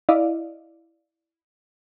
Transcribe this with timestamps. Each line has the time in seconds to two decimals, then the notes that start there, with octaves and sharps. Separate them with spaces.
0.09 E4 D5 D#5 F5